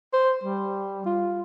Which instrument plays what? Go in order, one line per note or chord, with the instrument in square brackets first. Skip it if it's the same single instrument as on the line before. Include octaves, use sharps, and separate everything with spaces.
[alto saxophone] C5
G3
F4